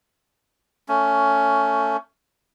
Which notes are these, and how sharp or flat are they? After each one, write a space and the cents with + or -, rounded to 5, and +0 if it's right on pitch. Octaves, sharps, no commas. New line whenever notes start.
A3 +20 C#4 +15